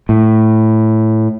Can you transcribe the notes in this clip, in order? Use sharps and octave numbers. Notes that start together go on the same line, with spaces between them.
A2